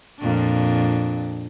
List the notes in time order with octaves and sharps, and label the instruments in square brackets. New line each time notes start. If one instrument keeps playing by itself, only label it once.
[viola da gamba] F2 A#2 D4